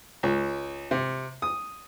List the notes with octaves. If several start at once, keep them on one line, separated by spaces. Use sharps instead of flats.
C#2
C3
D#6